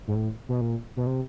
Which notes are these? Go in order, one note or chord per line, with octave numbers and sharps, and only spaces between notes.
G#2
A2
B2
A#2
B2
C3